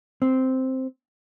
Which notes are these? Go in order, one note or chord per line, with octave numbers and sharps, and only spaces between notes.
C4